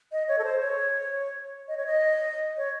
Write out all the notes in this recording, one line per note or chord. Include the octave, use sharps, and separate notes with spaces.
D#5
C#5
A4
C5
C#5
D#5
C#5
D#5
C#5